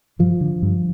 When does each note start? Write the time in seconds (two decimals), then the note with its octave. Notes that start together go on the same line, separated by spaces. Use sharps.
0.19 G2 F3
0.41 D3
0.62 G2